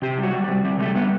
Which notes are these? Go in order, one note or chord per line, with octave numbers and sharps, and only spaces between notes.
C3 G4
G3
F#4
G3
C3 G3
C3 G3
G3 A3
G3 B3